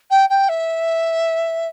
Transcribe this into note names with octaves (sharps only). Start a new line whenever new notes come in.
G5
G5
E5